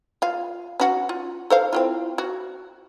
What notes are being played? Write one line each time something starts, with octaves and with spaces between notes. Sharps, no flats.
F4 F5
C#4 F#4 F#5
F4
A4 C5 F5
C4 E4 F4
F#4